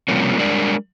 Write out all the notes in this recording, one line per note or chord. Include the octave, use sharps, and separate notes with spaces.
C3 F3 G3 A#3 C#4
G3 G#3 D4 A#4 D5